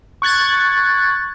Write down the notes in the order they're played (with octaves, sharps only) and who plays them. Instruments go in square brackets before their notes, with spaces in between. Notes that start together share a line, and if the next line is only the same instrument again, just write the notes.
[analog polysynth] C#6 F#6 G#6 A6